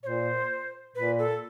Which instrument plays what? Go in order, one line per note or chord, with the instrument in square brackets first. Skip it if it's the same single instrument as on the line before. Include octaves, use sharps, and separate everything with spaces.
[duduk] A#2 [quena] C#5
[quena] C5
[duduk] A#2 [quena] B4
[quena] A4